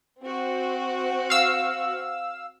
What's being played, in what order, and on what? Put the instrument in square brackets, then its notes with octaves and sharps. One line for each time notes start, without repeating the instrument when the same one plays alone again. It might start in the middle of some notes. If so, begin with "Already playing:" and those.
[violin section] C4 F#4
[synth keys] F5 E6